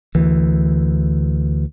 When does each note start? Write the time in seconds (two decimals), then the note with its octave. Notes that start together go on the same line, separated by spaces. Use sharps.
0.15 D2 E3